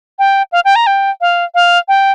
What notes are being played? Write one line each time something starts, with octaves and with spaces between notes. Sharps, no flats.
G5
F5
G5
A#5
G5
F5
F5
G5